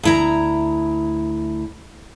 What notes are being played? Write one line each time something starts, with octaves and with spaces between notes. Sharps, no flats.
D2 E4 A#5